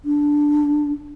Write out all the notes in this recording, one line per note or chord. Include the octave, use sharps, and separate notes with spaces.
D4